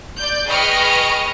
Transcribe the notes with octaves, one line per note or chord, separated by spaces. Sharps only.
D5 G6
G#4 B4 D#5 G5 C#6 F6